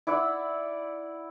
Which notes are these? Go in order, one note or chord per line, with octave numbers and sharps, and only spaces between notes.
E4 D5 F#5 E6